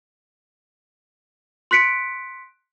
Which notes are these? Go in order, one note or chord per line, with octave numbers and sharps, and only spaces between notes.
C6 F#6 B6 C#7 D7